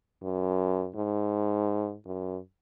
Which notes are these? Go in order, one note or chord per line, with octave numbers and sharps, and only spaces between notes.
F#2
G#2
F#2